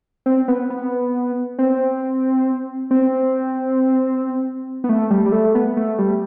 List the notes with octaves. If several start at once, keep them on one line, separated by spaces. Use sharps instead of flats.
C4
B3
B3
C4
C4
B3
A3
G3
G3
A3
B3
A3
G3